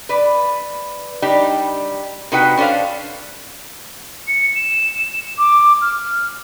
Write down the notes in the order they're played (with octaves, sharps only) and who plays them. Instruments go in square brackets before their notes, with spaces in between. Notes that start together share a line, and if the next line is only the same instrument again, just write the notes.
[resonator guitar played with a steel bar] B4 D5
G3 D4 D#4 G4
C3 D#4 F#4 B4 F#5 G5
C#4 D4 A4 C5 F5
[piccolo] C#7
E7
D6
F6